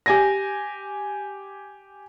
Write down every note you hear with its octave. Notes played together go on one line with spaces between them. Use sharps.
G4 G#5 A#6